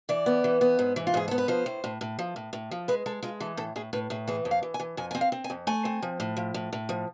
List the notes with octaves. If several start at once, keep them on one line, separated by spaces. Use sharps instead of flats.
E3 D5
B3
E3
B3
G#2
E3
F4
G#2 G#4
B3 A4
B4
F3 C5
A2
A2
A2
F3
A2
A2
F3
G#3 B4
G#3 A4
G#3 F4
E3 A4
A2 A4
A2 G#4
A2 B4
A2 G#4
E3 G#4
F2
F5
E3
G#5
E3
F2 G#5
C4 G#5
F5
C4
G#5
F2
A3 G#5
C4
F3
A2
F3
A2
A2
F3